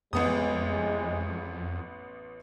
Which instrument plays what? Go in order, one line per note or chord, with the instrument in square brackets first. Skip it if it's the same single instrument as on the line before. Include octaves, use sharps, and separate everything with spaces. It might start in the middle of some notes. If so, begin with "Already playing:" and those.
[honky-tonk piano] A1 B3 D#6 [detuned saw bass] F2 [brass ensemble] A2 C3 G#3